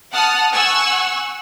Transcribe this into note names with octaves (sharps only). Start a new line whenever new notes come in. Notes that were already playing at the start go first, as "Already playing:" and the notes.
F#5 A5 D#6 F6 F#6
F#5 G#5 C#6 E6 F#6